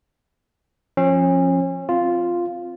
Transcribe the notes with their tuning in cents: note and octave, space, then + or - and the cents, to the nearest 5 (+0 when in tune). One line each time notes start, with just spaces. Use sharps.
F3 +0 C#4 -35
C4 +5 F4 +0